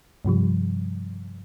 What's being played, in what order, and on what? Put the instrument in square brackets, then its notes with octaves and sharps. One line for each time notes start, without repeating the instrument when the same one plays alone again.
[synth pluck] G2 C3 F3 G3